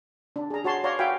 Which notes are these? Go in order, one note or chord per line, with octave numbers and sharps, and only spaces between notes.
D4
G#4 A#5
F#4 C#5 A5 C6
C#5 D5 F5 F#5 A#5 C6
F#4 E5 F5 G5 G#5 B5